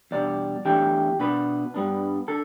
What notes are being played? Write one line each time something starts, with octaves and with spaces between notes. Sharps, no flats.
E2 B2 G3 D4 D5
E2 E3 A3 D4 G4
B2 B3 D4 B4
G2 G3 B3 D4
D3 A4